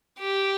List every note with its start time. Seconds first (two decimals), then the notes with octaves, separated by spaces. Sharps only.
0.19 G4